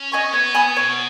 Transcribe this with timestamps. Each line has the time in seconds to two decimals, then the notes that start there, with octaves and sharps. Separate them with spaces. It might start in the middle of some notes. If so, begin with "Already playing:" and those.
Already playing: C#4
0.12 D#5 G#5 C#6
0.33 B3 C#5
0.54 G#5 B5 D#6
0.76 B2 C#5